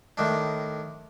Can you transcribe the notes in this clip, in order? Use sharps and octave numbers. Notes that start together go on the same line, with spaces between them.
A2 D#3 D4